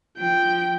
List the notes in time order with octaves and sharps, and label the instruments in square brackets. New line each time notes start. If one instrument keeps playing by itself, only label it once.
[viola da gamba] F3 [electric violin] G5